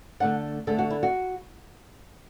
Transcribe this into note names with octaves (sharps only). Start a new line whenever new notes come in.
D3 A3 D4 F#5
D3 A3 D4 A4
F#4
E4
F#4